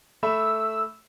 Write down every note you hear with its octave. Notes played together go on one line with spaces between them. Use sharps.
A3 E5 B5 E6